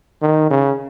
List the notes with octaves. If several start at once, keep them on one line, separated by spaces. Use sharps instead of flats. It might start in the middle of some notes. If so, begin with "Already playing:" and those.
D#3
C#3